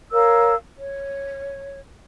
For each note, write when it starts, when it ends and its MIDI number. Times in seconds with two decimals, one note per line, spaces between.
0.12 0.55 70
0.12 0.55 73
0.12 0.55 77
0.12 0.55 88
0.78 1.80 73